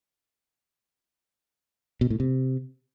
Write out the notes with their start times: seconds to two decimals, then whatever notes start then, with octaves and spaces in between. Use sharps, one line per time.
2.01 B2
2.10 A2
2.20 C3